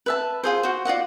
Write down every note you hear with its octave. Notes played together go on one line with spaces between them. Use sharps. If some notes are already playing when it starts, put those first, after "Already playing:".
B4 E5 A5
F4 G#4 C5
F#4 C5
F4 D5 D#5 F#5